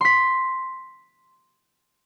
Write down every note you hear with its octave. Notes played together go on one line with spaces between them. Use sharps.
C6 B6